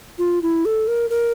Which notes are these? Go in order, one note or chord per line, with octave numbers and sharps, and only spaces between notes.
F4
E4
A4
A#4
A#4